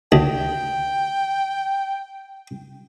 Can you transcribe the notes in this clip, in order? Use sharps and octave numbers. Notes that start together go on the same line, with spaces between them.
D2 G5